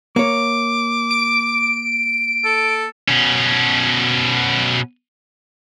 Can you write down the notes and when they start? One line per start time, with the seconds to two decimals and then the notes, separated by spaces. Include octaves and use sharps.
0.16 A#3 C#5 D6
1.11 D7
2.44 A4
3.08 B2 C#4